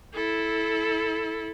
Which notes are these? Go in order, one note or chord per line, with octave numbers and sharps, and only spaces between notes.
E4 A4